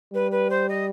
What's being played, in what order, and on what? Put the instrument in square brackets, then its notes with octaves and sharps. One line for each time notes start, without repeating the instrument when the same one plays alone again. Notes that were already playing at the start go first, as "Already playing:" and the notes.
[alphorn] G3 [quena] B4
[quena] B4
C5
D#5